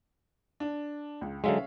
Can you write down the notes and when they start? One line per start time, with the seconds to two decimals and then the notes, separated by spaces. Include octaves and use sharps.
0.60 D4
1.21 C#2
1.44 D3 F#3 G#3 C#4 E5 F5